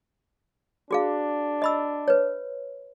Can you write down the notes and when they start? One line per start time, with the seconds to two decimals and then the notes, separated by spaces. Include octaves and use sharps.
0.91 D4 F#4 G#4 F5
1.62 D#5 B5 E6
2.08 B4 C#5